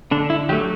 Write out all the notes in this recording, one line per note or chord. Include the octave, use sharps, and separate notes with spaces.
D3 D4
E4
F#3 A3 G4